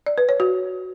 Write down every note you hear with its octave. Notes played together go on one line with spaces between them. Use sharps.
D5
B4
C#5
F#4